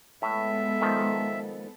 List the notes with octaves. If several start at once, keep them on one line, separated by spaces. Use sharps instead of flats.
A2 G#3 B3 A4 E5
D#3 F3